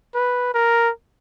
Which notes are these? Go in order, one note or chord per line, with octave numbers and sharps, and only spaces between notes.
B4
A#4